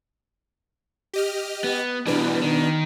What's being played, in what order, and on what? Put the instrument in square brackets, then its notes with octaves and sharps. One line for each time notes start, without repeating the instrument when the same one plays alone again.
[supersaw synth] G4 D#5 F6
[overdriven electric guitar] B3
[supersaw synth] B2 B3 D4 [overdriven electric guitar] E3 G3
[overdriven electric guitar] D#3